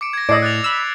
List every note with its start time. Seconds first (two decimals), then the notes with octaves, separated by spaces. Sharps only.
0.01 D6 C#7 D7
0.13 G#6 A#6
0.29 A2 D5 D#5 E6 C7 D7
0.42 F#6 A6 F7
0.64 B5 E6